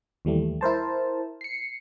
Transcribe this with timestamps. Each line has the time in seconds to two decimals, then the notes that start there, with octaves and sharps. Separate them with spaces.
0.25 D#2 E3 G3 A3
0.61 E4 A#4 C5 A5
1.41 C7 C#7